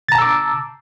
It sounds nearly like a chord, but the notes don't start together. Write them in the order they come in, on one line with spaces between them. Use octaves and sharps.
A6 A#5 A5 E6 D6